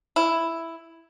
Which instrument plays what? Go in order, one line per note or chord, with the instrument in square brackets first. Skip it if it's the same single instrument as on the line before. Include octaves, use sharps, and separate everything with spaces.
[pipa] E4